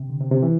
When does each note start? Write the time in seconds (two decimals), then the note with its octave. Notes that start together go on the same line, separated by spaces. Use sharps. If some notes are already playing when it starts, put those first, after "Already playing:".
Already playing: C3
0.10 D3
0.20 C3
0.31 C3
0.43 E3